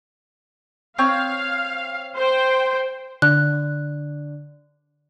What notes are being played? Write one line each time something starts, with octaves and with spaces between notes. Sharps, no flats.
C4 C#5 F5
C5 G5
D3 F#6